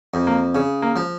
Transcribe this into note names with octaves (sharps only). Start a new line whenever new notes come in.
F2
A#3
C#3
A#3
F3